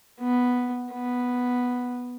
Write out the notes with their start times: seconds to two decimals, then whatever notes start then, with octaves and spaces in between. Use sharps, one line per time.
0.21 B3
0.92 B3